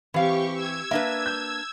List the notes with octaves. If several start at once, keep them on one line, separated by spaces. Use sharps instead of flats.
E3 C4 G4 F5 C#6
E6 G#6
A#3 D4 B4 E5
G6